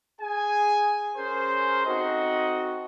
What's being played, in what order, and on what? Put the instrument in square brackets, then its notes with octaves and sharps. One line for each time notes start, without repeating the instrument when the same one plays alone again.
[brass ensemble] G#4 G#5
C#4 G#4 A#4 C5
C4 D#4 F#4 A4 D#5